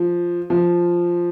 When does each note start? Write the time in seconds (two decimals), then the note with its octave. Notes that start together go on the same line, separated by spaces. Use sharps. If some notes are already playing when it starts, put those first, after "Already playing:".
Already playing: F3
0.50 F3